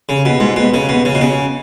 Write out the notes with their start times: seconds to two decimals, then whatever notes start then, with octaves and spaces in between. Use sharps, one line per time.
0.09 C#3
0.25 B2
0.40 G#2
0.56 B2
0.74 C#3
0.89 B2
1.05 C#3
1.15 B2
1.21 C#3